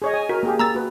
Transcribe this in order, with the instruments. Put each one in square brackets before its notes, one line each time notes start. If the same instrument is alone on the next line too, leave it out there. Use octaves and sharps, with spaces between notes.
[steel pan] G#4 C#5 D#5
G#5
[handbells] F#4 [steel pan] A#4
[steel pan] A#3 G4 G#4
[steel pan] A#3 [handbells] A#5 E6 A6
[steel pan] F#4 B4